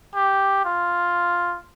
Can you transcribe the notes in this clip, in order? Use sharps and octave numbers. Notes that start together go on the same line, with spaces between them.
G4
F4